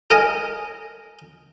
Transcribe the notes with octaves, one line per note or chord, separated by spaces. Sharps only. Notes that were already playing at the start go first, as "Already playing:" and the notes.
A4 A#4 D#5 G#5 A#5